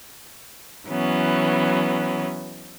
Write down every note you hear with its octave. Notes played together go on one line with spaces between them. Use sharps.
E3 F#3 B3 C#4